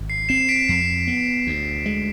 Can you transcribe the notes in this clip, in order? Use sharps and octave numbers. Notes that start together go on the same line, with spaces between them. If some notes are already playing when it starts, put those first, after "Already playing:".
Already playing: G#1
C7
C4 C7 E7
B6 D7
F2 C7
B3
D2
G#3